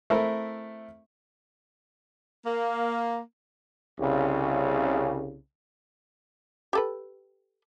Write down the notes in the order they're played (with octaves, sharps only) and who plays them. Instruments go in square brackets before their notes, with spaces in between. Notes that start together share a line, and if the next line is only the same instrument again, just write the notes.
[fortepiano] A3 C4 E4 A#4
[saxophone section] A#3
[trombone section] C2 C#3
[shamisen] G4 A4 B4